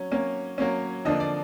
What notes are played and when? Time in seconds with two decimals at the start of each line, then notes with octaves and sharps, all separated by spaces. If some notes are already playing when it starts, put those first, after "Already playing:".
Already playing: F#3 C#4
0.11 F#3 A#3 C#4
0.58 F#3 A#3 C#4
1.05 D3 F3 A#3 D4 D#5
1.20 D5